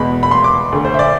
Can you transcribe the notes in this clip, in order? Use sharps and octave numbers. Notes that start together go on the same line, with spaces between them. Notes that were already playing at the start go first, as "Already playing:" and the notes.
Already playing: E2 B2 G#3 B3 B5
B5
C6
D6
D2 D3 A3
C5
E5
D5